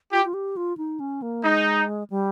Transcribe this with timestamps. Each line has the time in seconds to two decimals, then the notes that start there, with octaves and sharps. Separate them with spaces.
0.12 F4 G4
0.25 F4
0.34 G4
0.57 F4
0.77 D#4
1.00 C#4
1.22 A#3
1.44 G#3 D#4
2.10 G3